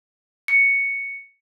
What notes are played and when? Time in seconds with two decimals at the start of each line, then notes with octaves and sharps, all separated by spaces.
0.48 C#7